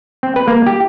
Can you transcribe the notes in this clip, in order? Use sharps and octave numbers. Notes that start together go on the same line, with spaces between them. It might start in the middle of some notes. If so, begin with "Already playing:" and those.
C4
B4
A#3
G4